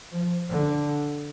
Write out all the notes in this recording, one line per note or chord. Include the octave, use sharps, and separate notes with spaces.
F3
D3